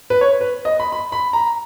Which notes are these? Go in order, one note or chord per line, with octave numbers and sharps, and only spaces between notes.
B4
C#5
B4
D#5
B5
B5
B5
A#5